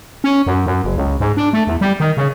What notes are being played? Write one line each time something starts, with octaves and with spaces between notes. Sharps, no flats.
C#4
F#2
F#2
F#1
C#2
G#2
D4
A3
E2
G3
D#3
C#3